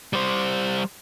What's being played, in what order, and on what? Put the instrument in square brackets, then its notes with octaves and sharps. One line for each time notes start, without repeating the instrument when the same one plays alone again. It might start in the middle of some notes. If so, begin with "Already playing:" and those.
[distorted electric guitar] G3 C5